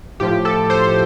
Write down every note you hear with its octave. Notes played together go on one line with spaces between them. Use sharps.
A2 F3 G4
A4
C5